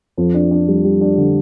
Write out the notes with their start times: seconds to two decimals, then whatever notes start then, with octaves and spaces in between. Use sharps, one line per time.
0.17 F2
0.34 D4
0.51 D4
0.68 G3
0.84 G3
1.01 D4
1.18 D3